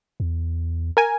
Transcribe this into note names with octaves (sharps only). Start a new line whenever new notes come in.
E2
A#4 G#5